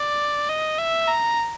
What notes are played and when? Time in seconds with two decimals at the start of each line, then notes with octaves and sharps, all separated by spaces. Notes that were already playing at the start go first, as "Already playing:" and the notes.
Already playing: D5
0.49 D#5
0.78 E5
1.08 A#5